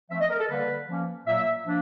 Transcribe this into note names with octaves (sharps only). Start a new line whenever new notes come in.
F3 A3 C4 E5
D#5
A#4
A4
D3 G3 A#3 B4
F3 A#3 C#4
A#2 F#3 A#3 E5
F3 A#3 D4